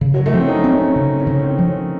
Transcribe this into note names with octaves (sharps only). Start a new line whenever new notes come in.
C#3
F#3
A3
F3 C4
C#4
D#4
C4
C#4
C#3
C#4
C#3
C4
F3
C#4